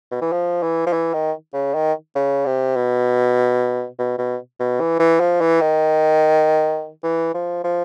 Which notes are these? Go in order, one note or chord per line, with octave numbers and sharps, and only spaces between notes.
B2
E3
F3
E3
F3
E3
D#3
C#3
D#3
C#3
C3
B2
B2
B2
B2
E3
E3
F3
E3
D#3
E3
F3
F3